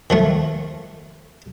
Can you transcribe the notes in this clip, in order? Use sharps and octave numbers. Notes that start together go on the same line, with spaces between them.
D#3 F3 A3